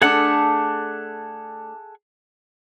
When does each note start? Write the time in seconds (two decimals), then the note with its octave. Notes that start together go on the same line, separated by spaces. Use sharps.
0.02 A3 D4 G#4 A4 F#5